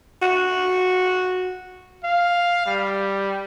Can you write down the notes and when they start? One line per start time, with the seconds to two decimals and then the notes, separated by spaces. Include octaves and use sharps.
0.22 F#4
2.04 F5
2.66 G3